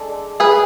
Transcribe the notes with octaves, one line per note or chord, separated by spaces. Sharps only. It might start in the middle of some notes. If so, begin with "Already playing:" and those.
Already playing: G#3 D4 A4
G#4 B4